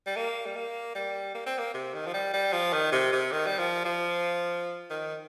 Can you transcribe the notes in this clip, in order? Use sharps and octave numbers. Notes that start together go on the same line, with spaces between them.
G3
A#3
G3
A#3
G3
A#3
C4
A#3
C3
D#3
F3
G3
G3
F3
D#3
C3
C3
D#3
G3
F3
F3
D#3